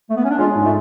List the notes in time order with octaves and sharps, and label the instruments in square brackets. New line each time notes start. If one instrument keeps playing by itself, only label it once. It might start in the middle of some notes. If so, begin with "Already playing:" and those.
[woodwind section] A3
B3
C#4
D4
[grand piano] G#3 [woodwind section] C#4 F4
[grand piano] G#2
[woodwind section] A3